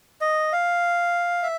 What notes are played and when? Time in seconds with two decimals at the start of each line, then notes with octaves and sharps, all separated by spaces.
0.21 D#5
0.52 F5
1.43 E5